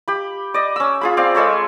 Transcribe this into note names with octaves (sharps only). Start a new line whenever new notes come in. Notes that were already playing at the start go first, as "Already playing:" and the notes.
G4 B5
D5 D#5
C#4 E6
F4 G#4 B5
C4 D5 F5
G#3 A4 C#5 B5